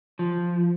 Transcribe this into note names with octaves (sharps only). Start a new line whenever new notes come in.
F3